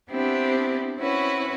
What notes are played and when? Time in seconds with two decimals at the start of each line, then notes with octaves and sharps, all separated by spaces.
0.10 B3 C4 D4 E4 G4
0.98 C4 C#4 E4 F#4 B4